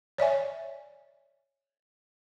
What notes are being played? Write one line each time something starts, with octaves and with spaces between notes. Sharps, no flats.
C#5 D5 E5 G#5